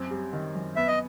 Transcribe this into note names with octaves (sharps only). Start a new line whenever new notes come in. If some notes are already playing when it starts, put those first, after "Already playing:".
Already playing: F#2 C4
G3
D#3
F#2
B3 E5
D#5